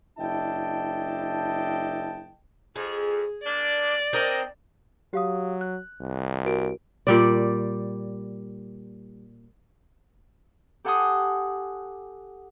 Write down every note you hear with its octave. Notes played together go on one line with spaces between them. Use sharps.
F#1 D4 E4 D#5 G5 A5
F2 G#4
A#3 D4 D5
C4 D4 A#4 D#5
F#3 G4 F5 D#6
F#6
C2
F#4 A#4 D7
A#2 G3 D5
G4 A4 F#5 G#5 C6 D#6